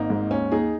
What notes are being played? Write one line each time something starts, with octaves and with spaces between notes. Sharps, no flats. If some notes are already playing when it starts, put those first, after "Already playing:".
Already playing: G#1 A#3 D#4
G#2
D#2 C#4
D#2 D#4 G#4